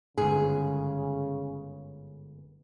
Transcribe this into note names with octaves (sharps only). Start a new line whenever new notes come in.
G1 G#2 C#3 G#4